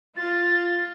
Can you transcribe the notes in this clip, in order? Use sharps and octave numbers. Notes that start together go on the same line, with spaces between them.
F4 A6